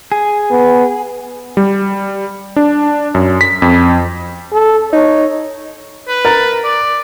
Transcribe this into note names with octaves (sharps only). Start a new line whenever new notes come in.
G#4
B3
G3
D4
F#2
B6
F2
A4
D#4 C#5
B4
A#4 A6
D5